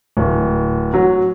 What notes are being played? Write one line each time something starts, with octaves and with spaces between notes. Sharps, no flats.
D1
F#3